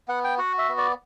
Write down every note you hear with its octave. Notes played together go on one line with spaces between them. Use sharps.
B3 F#5
G5
F#4 F#5
E5
B3
D5